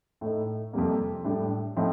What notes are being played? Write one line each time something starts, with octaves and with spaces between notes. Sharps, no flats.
A2 A3 D#4
F2 C3 G3 A#3
A2 G3 D4
A2 F3 C4 D#4